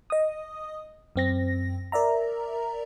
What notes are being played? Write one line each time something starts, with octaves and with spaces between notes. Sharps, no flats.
D#5 D#6
F#2 C4 A#6
A#4 D5 E5 A#5